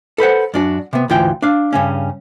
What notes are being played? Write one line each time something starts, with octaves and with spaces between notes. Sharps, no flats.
A4 B4 C5 F#5
F#2 D4 F#4
C3 B3
D2 G#2 E3 F4 G5
D4 F5
G2 C#3 C#4